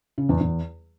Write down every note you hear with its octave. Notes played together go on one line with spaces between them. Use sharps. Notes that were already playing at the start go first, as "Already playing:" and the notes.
C#3
E2
E2